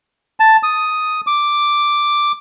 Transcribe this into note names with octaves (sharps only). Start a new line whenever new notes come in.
A5
D#6
D6